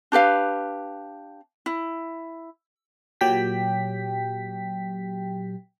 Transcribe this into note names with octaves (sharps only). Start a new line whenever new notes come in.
D4 G4 B4 F5
E4
A#2 F#3 G4 G5 B6